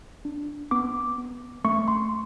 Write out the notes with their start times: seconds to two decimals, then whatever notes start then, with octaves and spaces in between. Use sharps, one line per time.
0.25 D4
0.71 B3 D6
1.18 B3
1.64 A3 C#6
1.88 C6